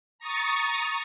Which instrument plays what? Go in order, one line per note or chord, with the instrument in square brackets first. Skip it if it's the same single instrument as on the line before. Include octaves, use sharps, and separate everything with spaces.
[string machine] A#5 C#6 D#6 A6